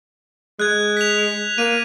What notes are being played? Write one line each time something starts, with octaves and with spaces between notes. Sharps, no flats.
G#3 F#6 G#6
B6 F7
A#3 D#7